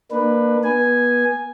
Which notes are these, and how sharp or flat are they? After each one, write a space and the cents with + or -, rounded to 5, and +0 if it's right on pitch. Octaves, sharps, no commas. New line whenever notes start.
A#3 +0 D4 +35 B4 +0
B3 -25 G#5 +0